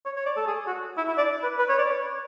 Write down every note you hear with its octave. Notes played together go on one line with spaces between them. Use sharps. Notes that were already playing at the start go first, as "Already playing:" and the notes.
C#5
C#5
D5
A4
G#4
F#4
E4
E4
D5
B4
B4
C#5
D5
C#5